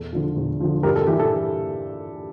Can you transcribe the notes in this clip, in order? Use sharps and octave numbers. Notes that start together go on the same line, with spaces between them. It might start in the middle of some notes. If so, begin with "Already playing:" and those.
Already playing: E2 A4
D3 F3
E2
D3 F3
G2 G4 A#4
A4
E3 G4
A4